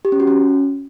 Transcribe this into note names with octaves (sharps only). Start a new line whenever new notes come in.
G4
C#4
F#4
C#4